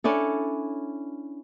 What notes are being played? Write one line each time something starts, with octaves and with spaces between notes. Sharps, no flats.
C#4 D4 E4 A4